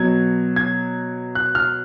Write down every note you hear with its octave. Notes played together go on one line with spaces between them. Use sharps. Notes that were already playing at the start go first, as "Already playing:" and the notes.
Already playing: B2 F#3 G#6
G#6
F#6
F6